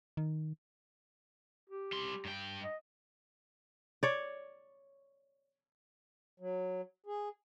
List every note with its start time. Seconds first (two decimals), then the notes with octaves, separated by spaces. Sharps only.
0.17 D#3
1.69 G4
1.92 G3 C6
2.25 G2 G5
2.64 D#5
4.03 C#5 D5
6.40 F#3
7.06 G#4